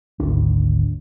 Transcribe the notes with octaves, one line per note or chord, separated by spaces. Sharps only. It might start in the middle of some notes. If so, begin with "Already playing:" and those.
G#1 D2 D4